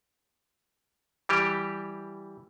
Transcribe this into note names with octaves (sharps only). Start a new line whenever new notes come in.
E3 G3 G4